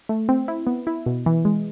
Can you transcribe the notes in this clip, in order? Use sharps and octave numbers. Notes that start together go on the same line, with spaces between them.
A3
C4
E4
B3
E4
B2
E3
G#3